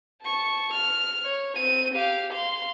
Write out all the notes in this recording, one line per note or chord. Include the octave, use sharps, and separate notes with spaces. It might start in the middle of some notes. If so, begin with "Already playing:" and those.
A5 C#6
F6
C#5
C4 D#7
G4 F5
F5 C6